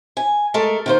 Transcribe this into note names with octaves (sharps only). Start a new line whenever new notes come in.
G#5
G#3 A3 A4 A#4
D#3 A#3 C5